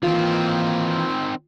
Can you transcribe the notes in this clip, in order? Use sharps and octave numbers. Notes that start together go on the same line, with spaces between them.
D#3 E3 A#3 C4 F4